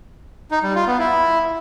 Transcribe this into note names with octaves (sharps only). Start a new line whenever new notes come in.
D#4
G3
F4
B3
E4